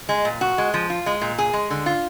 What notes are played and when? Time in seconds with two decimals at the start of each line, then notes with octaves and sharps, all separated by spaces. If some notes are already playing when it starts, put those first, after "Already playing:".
0.09 G#3
0.25 A#2
0.41 F#4
0.58 G#3
0.74 F3
0.90 F4
1.06 G#3
1.21 A#2
1.38 G#4
1.53 G#3
1.70 D3
1.86 F4